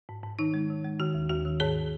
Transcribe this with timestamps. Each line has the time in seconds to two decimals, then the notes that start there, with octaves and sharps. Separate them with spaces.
0.09 G#2
0.24 G#2
0.39 D#3 D#4
0.54 G#3
0.70 D#3
0.85 G#3
1.00 D#3 F#4
1.14 D#2
1.29 D#2 F#4
1.45 D#3
1.60 G#2 G#4 C#5